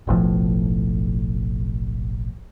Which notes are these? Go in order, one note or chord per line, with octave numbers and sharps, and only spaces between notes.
F#1 B1 A2 F3